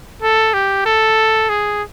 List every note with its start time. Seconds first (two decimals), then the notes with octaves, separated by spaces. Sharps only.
0.22 A4
0.54 G4
0.86 A4
1.49 G#4